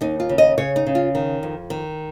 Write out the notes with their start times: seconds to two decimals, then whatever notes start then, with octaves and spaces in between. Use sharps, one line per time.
0.01 D#2 D#4
0.20 F4
0.29 C#3
0.38 D#5
0.58 C#3 C#5
0.76 D#4
0.86 C#3
0.95 F4
1.15 D#3
1.43 F2
1.70 D#3